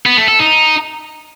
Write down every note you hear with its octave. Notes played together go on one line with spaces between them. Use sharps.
B3
A3
A4
D#4